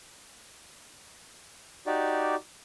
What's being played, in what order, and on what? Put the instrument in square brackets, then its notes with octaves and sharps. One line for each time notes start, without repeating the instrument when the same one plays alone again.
[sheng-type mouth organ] D#4 F#4 G4 D5